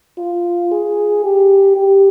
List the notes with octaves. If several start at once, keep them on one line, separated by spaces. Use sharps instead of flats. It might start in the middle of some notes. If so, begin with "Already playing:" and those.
F4
G#4
G4
G4